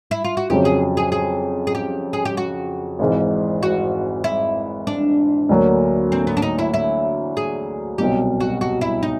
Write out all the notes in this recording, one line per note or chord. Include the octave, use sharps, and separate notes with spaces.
E4
F4
F#4
F2 C#3 F#3 G4
G#4
G#4
G#4
G#4
G4
G#4
G4
F#4
G#1 G#2 E3
F#4
E4
D4
D2 D3 F#3 A#3
C4
B3
D4
D#4
E4
E4
G#4
C2 B2 F#3 G4
F#4
F#4
E4
D#4